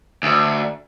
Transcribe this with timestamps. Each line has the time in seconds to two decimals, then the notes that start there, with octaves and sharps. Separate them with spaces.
0.23 D2